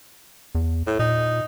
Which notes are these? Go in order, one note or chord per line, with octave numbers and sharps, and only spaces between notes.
E2
A2
A#2 D#4